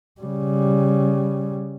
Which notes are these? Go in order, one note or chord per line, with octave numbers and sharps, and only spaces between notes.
C#3 G3